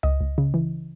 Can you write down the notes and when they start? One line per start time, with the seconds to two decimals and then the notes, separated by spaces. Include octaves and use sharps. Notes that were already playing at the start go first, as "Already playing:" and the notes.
0.03 C#2 D#5
0.21 C#2
0.38 C#3
0.54 E3